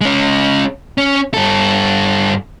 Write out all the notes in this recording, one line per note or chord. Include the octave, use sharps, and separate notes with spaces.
G#3 C#4
C#4
G2 A4